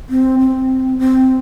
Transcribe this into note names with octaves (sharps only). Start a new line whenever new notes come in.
C4
C4
C4